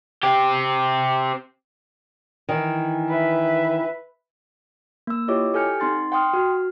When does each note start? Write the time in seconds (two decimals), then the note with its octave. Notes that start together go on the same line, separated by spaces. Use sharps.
0.23 C4 G4
2.49 D#3 E3
3.09 B4 E5
5.07 A#3 E6
5.28 E4 F4 G4 C#5 D#5 D6
5.54 G4 A4 G#5 F6 G6 C#7
5.80 C4 D#4 C6 A6
6.12 F#5 G5 C6 D#6 F6
6.34 F#4 F6